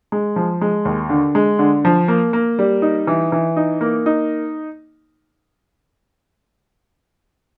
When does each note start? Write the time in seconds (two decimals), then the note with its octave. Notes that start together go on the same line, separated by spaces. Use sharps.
0.12 G#3
0.36 F3
0.61 G#3
0.85 D#2
1.10 D3
1.35 G#3
1.59 D3
1.85 F3
2.08 A#3
2.33 A#3
2.59 G3
2.82 D#4
3.07 E3
3.32 E3
3.56 D#4
3.81 A#3
4.06 D#4